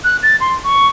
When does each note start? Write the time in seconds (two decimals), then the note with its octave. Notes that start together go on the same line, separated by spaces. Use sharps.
0.04 F#6
0.23 A6
0.40 C6
0.64 C#6